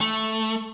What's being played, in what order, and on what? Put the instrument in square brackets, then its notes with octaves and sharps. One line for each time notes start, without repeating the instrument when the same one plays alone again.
[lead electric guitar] A3